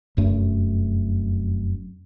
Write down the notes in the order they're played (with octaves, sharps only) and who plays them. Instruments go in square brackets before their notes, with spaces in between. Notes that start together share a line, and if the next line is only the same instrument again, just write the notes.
[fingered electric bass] F1 F#2 A3